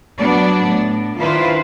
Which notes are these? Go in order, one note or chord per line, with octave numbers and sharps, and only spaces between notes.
F#3 B3 D4 D5
A2
D#3 D4 E4 F4 B4 C5